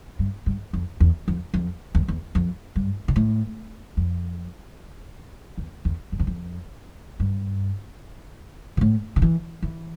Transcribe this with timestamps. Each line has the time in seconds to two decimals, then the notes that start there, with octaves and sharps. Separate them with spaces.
0.19 G2
0.46 G2
0.73 F2
1.00 E2
1.28 F2
1.54 F2
1.95 E2
2.08 E2
2.35 F2
2.76 G2
3.08 B2
3.16 A2
3.97 F2
5.57 E2
5.85 E2
6.12 F2
6.19 E2
6.27 F2
7.20 G2
8.77 B2
8.81 A2
9.16 D3
9.22 E3
9.62 E3